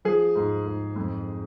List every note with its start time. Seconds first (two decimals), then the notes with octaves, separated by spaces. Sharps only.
0.05 F3 G#4
0.35 G#2
0.66 G#2
0.96 F2